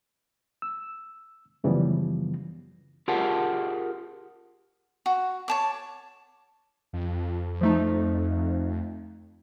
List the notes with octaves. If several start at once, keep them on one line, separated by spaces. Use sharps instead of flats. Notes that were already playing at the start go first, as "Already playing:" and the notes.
E6
F#2 C#3 E3 F3 G3 B3
F4 G4 G#4 A#4 F#5 A5
F#4
C#5 A5 D6
F2
F3 A3 D#4